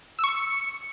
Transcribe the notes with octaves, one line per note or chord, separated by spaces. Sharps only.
E6
C#6
C#7